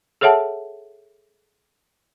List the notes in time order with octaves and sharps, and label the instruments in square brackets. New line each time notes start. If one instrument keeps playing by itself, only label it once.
[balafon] G#4 A4 C#5 E5 F#5 A5